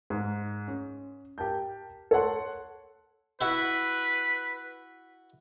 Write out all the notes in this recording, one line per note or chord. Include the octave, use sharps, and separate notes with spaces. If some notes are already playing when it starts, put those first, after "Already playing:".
G#2
C#4
G4 A#4 A5 G6
A4 C#5 F#5 C6
E4 F#4 B4 E5